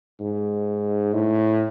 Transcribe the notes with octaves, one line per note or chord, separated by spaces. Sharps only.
G#2
A2